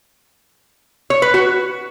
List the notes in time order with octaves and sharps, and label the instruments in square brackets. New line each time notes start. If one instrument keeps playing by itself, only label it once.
[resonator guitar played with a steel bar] C#5
B4
F#4